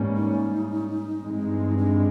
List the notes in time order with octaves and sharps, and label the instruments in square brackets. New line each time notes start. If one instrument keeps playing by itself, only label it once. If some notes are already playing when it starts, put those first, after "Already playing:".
Already playing: [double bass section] G#2 E3 G3 A#3 C#4
[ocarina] D#4
[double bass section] G2 E3 G#3 C4
[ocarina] D4